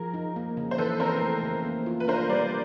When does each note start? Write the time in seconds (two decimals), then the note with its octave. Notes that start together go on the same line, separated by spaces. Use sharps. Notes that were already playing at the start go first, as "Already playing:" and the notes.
Already playing: F3 G#4 A#4
0.14 D#4
0.36 A#3
0.57 C#3
0.71 C5
0.78 E3 A4 B4
1.00 C4 A#4 C5
1.22 A3
1.43 C#3
1.65 A#3
1.86 F4
2.00 B4
2.08 D4 A#4 C5
2.29 G3 C5 D5